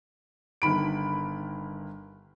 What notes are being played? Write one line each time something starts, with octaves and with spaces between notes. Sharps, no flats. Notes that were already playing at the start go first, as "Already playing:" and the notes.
G1 D#3 B5 D7